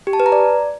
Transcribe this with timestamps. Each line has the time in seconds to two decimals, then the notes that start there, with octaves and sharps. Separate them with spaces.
0.07 G4
0.13 A5
0.20 B4
0.26 A#5
0.32 D5